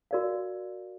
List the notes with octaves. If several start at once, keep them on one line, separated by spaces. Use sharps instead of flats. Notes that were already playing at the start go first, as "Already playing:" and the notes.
F#4 A#4 D5 F5